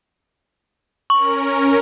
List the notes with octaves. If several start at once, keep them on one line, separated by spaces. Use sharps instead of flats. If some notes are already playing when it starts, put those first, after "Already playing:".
C#4 A#4 C#6